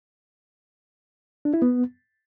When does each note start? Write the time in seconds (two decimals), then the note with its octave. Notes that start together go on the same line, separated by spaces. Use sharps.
1.45 D4
1.54 E4
1.62 B3